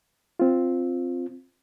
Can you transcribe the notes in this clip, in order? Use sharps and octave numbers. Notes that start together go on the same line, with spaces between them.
C4 F4